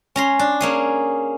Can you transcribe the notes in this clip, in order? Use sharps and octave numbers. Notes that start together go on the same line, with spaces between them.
C#4 A#5 C6
D4
A#3 C#4 G#4